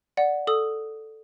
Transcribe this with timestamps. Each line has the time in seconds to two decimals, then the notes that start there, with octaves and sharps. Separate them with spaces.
0.17 D5 F#5
0.47 A4 D#6